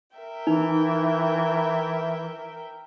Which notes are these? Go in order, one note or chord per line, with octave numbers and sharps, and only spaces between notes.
A#4 E5 G5
E3 D#4